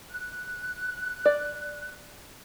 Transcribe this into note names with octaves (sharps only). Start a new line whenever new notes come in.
F#6
D5